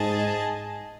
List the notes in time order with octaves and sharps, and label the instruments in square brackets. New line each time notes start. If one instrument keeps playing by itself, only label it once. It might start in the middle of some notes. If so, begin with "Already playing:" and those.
Already playing: [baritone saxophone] G#2 [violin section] G#4 D#5 A5